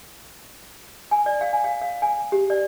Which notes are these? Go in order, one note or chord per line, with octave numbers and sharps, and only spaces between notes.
G#5
D5
F5
G#5
F5
F5
G#5
G4
D5